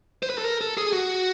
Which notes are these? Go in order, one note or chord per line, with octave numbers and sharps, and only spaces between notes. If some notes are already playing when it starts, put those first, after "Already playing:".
C5
B4
A4
A#4
A4
G#4
F#4